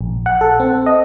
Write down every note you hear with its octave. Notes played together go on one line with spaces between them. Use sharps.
A#1
F#5
A4
C4
D#5